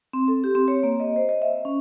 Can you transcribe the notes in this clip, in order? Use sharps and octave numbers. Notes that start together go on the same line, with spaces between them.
C4
A4
G4
C4
C#5
A#3
D#5
C5
D#5
E5
C#4